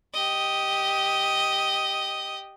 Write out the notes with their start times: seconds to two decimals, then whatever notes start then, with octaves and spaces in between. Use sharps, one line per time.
0.14 G4 D#5